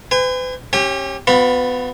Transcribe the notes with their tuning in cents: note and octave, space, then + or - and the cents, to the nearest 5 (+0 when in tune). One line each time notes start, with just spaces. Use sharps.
B4 +45 G#5 -40
C#4 -25 G4 +0 G5 +45
B3 +25 F4 +45 B5 +0